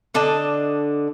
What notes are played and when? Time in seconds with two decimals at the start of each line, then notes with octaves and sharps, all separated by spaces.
0.14 D3 D4 D#5 A5